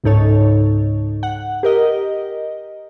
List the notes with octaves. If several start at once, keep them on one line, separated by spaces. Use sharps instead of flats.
C#2 G#2 D#4 A4 C#5
F#5
G4 A#4 D#5